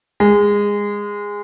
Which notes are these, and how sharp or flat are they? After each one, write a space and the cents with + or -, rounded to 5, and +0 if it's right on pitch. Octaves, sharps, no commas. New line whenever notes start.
G#3 -20